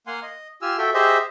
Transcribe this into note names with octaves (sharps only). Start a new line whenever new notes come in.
A#3 F5 F#5 G#5 C6
D#5
F4 G4 G#5 E6 F6
F#4 A4 E5 G5
G4 G#4 C5 D#5 E5